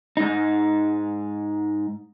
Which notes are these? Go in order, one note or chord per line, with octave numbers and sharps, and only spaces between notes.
G#2 D#4